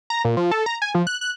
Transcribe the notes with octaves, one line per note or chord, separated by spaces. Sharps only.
A#5
A#2
F3
A4
A#5
G#5
F3
F#6
F#6